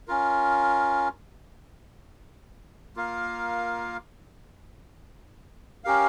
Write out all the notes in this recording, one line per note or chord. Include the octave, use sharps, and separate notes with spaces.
C#4 F4 A#4
A#3 F4 A#4 F5
C#4 G4 A#4 F5